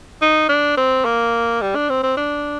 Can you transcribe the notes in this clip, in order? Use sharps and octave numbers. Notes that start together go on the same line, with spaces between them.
D#4
D4
C4
A#3
G3
D4
C4
C4
D4